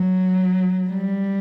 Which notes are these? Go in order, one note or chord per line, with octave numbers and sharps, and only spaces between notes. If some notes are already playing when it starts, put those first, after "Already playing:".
Already playing: F#3
G3